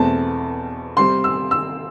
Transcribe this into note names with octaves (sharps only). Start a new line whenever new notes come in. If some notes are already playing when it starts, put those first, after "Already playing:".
Already playing: E2 B2 A3 C4 A5
C3 G3 C4 C6
E6
E6